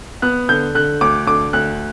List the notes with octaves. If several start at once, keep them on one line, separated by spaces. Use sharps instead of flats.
B3 F#6
D3 G6
D3 F#6
D2 D6
D3 D6
D2 F#6